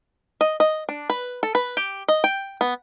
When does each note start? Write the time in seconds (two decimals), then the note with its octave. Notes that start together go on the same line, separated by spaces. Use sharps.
0.41 D#5
0.60 D#5
0.89 D4
1.10 B4
1.43 A4
1.55 B4
1.77 G4
2.08 D#5
2.24 G5
2.61 B3